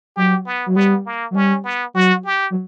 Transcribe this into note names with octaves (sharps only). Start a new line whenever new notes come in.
F#3 G4
B3
F#3
G3 B3
A#3
F#3
G3 C#4
B3
F#3 F#4
G4
F#3